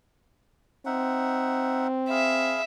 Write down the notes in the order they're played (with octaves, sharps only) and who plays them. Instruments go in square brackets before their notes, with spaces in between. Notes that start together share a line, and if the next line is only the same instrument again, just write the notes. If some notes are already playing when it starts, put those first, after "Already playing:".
[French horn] C4 [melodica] D#4 E5 F#5
[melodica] G#4 F5 B5 [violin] E5